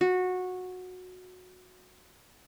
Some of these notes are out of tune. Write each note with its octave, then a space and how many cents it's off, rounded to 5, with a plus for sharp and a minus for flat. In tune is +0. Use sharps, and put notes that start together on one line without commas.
F#4 -15